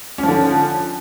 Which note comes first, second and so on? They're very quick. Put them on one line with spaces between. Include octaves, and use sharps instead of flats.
C#4 F3 D3